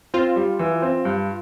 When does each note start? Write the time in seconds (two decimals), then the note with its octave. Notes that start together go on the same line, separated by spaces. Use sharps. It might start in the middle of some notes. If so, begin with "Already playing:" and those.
0.14 C4 F4
0.36 G3
0.59 E3
0.82 C4
1.05 G2